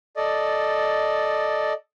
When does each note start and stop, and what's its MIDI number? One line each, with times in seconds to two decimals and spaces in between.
0.17 1.73 69
0.17 1.73 74
0.17 1.73 75